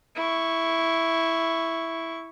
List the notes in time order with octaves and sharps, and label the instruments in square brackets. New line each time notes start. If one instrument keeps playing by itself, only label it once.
[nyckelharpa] E4 C#6